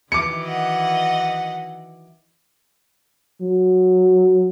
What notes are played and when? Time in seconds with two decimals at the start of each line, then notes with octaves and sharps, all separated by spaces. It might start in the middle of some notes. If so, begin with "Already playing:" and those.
0.12 D#3 E3 F#3 D6 C#7
0.44 D#5 F#5
3.41 F#3